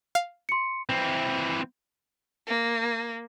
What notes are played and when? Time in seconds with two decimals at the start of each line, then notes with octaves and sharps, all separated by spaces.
0.15 F5
0.49 C6 C#7
0.89 E3 C4
2.47 A#3